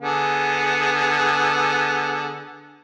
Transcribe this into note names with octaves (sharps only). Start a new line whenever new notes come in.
D3 B3 G#4